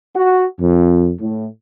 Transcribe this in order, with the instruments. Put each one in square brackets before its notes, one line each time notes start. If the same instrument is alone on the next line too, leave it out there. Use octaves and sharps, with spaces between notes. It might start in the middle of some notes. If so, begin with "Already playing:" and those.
[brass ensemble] F#4
F2
A2